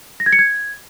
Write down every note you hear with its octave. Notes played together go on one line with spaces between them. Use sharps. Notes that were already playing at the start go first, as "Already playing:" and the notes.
A#6
G#6
C#7
G#6